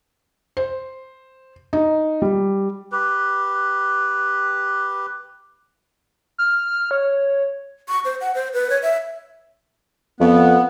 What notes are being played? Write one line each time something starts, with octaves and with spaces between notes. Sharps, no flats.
C5
D#4
G3
G4 B4
F6
C#5
C#6
C5
F#5
C5
B4
C#5
E5
F2 B3